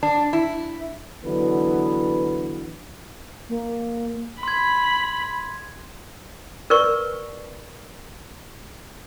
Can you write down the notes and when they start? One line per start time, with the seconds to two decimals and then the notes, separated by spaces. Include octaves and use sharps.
0.03 D4
0.33 E4
1.24 D3 E3 F#3 B3
3.49 A#3
4.43 B5 C6 G#6
6.70 A#4 B4 D5 C#6